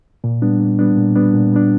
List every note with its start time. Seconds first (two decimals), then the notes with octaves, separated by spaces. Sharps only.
0.24 A#2
0.42 G3 B3 D4
0.60 A#2
0.79 G3 B3 D4
0.97 A#2
1.15 G3 B3 D4
1.34 A#2
1.52 G3 B3 D4